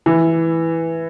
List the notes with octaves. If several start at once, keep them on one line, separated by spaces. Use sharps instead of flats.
E3